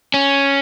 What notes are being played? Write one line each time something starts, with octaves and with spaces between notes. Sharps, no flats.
C#4